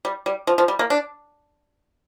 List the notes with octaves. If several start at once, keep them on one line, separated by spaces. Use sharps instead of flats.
G3
G3
F3
F3
G3
A#3
D4